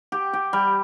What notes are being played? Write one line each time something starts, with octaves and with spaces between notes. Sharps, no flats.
G4
G4
G3